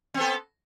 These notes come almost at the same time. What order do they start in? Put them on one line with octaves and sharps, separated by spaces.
C4 B3 A4